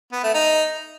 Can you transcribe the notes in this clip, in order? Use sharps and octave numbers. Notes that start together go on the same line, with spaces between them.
B3
A3
D#4